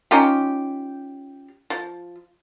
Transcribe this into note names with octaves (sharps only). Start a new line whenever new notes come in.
C#4 D#4 F4 G4
F3